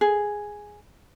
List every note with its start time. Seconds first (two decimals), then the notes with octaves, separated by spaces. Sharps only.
0.01 G#4